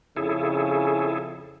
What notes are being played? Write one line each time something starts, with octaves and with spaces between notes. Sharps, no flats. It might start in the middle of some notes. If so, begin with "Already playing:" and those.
F2 C#3 E4 G#4 A4